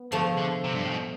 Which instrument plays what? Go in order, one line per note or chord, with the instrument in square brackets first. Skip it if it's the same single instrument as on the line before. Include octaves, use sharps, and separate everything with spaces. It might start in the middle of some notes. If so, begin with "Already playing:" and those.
Already playing: [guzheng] B3
[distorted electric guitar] D3 [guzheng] F3 A3
[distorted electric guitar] D3
C3
G2
A2
B2